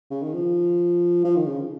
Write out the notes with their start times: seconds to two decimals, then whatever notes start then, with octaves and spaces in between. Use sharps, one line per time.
0.11 C#3
0.23 D#3
0.34 F3
1.24 F3
1.36 D#3
1.47 C#3